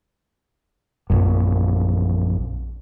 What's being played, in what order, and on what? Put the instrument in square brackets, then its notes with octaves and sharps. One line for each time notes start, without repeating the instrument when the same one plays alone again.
[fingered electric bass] A#1 F#2